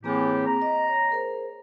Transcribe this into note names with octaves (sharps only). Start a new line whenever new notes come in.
A2 E3 A#3 C4 G4 G#4
A#5
D#5
C#5
G#4 A#4 C5